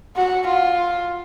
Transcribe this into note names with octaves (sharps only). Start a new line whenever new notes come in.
F#4
F4